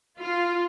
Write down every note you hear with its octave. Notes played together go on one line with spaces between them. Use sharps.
F4